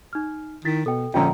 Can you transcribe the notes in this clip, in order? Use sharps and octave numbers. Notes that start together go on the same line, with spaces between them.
D#4 F6
D#3 E4 A6 B6
B2 A4 G5
A#1 D3 C#4 F4 G5 A#5